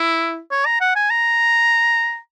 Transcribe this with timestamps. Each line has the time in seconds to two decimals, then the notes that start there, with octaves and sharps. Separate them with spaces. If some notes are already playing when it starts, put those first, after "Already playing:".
Already playing: E4
0.51 C#5
0.66 A#5
0.81 F#5
0.96 G#5
1.10 A#5